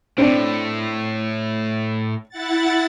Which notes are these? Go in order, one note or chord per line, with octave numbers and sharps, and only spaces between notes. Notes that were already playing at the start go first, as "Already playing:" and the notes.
A2 C4 D4
E4 F#5 A6